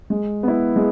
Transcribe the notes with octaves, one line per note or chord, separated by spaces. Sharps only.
G#3
B3 E4
G#3